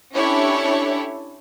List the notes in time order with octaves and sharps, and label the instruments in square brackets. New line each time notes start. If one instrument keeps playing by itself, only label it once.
[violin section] C#4 D4 E4 G4 A4 C#5